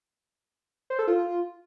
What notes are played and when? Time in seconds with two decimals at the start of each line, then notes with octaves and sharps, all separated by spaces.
0.90 C5
0.99 A4
1.08 F4